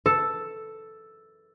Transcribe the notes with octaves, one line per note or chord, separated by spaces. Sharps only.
A4